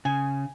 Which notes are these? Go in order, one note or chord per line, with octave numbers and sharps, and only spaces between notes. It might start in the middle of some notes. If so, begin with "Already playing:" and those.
C#3 G#5